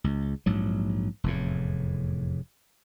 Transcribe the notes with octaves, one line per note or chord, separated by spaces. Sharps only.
C#2
A#1 G#2 F#3
F1 E2 A2